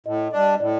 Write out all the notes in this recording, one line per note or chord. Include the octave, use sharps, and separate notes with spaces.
A2 D#5
G3 D4
A2 D5